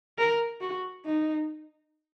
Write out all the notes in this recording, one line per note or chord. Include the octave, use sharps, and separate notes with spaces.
A#4
F#4
D#4